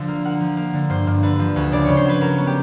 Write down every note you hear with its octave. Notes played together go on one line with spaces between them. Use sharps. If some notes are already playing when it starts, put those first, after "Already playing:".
Already playing: D3 F3
A#3
A#3 F#5
F3
A#3
D3
G2 C5
G2
D3 B4
F3
D2
C#3 D5
C#3 C#5
C5
F#3 B4
F#3 A#4
B3
G4